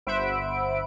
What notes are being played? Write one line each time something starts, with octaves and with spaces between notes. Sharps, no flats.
G1 C5 E5 F#5 B5 D7